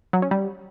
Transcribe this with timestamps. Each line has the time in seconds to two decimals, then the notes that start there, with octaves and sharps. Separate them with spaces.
0.13 F#3
0.22 C#4
0.31 G3